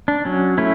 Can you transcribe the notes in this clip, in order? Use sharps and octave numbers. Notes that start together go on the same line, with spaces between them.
D4
F#3 C#4
A3 C#4 E4